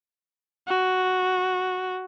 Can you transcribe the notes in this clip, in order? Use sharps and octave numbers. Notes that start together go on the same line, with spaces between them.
F#4